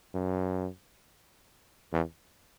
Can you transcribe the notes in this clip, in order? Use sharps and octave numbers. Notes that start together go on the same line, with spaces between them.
F#2
E2